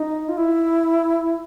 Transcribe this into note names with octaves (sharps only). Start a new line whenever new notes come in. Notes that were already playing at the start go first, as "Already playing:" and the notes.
Already playing: D#4
F4
E4